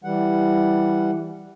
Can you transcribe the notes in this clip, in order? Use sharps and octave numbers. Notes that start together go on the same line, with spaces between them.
E3 G3 F#5